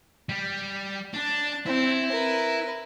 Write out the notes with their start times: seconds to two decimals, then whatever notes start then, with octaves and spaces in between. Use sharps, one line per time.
0.29 G3
1.14 D4 A5
1.66 C4 E4
2.11 A#4 B4